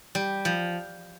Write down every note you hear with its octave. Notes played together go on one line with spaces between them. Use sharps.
G3
F3